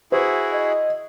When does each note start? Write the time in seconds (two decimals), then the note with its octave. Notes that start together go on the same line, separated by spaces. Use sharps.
0.12 E4 F#4 G#4 C5
0.52 D#5